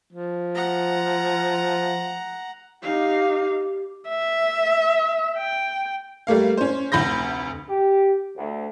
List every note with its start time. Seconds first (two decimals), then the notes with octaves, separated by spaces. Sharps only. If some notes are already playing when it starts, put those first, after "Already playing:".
0.13 F3
0.55 F#5 A#5
2.83 D#4 G4 F5
4.09 E5
5.37 G5
6.27 G3 A3 A#3 F5
6.57 C#4 C5
6.92 F1 D2 B5 G6 A#6
7.68 G4
8.36 D2